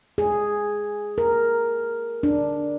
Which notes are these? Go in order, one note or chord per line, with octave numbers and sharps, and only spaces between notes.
G#4
A#4
D4